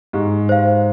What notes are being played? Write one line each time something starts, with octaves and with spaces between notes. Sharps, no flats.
G#2 G4
C5 F5